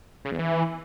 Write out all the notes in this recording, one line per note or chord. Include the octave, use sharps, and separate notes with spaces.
C#3
E2
E3